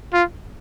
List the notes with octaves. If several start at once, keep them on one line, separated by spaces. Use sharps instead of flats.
F4